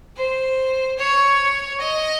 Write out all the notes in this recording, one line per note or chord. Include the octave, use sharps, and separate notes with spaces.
C5
C#5
D#5